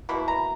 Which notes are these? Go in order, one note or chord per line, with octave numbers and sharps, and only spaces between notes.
B2 A#3 E4 B5
A#5